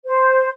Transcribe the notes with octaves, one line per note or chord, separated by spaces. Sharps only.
C5